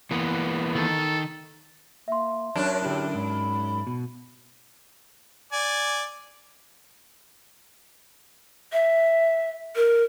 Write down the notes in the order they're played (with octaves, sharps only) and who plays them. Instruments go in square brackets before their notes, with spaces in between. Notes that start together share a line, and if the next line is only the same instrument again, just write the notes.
[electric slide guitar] E3 A#3 B3
[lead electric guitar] D#3 [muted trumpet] A4
[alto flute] A#3 [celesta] E5 C6
[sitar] F#2 D4 [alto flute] C#5
[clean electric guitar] D3 E4 [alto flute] G4
[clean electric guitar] G#2 [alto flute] B5
[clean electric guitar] B2
[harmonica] D5 G#5
[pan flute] E5
A#4